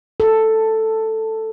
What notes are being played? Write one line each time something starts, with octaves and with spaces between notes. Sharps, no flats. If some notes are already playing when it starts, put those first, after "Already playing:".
A4